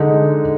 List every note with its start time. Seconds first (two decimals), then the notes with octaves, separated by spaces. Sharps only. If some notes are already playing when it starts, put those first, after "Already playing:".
Already playing: D3 G#3 D#4